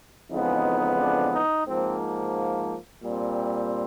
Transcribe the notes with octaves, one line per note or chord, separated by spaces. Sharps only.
F2 C#3 E3 G#3 B3 D#4
D4
D#4
G#2 F3 A#3 C4
A#2 G3 C4